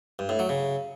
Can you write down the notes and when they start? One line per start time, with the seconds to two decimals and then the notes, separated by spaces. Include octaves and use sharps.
0.19 G2
0.29 A2
0.39 F#3
0.49 C#3